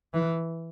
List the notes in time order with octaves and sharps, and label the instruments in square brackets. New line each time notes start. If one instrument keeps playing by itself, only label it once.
[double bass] E3